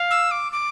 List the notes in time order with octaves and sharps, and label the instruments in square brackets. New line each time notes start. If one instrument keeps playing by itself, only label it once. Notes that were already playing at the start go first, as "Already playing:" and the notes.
Already playing: [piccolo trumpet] F5
[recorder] E6
D6
D6